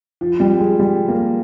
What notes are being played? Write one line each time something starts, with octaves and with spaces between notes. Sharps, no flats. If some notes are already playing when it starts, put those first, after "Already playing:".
F3
G3
G#3
G3
A#3